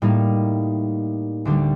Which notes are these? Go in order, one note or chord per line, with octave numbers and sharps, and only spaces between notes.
A2 G3 A#3 D#4
D2 D3 G3 D4 G4